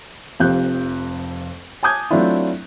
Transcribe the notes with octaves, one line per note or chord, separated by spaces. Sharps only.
F1 F2 G4 F5 F#6 G6
G#5 A5 D6 D#6 G6 G#6
F#3 A3 C4 D4 E4 F4